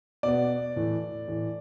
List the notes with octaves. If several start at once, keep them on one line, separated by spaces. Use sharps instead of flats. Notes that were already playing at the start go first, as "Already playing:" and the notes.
B2 B3 D5
A2 E3 A3
A2 E3 A3